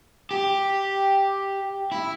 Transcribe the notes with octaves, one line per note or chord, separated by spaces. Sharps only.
G4
E4